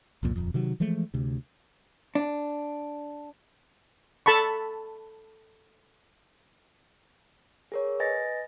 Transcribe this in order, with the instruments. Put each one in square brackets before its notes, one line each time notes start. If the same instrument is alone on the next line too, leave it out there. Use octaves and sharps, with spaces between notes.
[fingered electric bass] C2 F2 A#2
D#1 F2
C3 D#3 F#3
E3 F3 G#3 A3
D2 C3
[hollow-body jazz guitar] D4
[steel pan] A4 A5 B5 C#6
[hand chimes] G#4 A#4 C#5
B4 D#5 G#5 A6 A#6